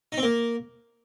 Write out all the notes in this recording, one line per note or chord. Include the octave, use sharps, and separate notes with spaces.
D#4
C4
A#3